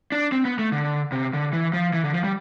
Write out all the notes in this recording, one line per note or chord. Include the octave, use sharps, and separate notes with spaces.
D4
C4
B3
A3
D3
C3
D3
E3
F3
E3
D3
F3
G3